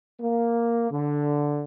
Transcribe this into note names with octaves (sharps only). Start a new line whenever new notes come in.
A#3
D3